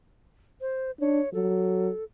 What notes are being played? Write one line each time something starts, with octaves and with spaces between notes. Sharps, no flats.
C5
D4 C#5
F#3 A4